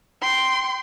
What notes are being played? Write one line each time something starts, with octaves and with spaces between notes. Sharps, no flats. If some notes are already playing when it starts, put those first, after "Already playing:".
G5 C6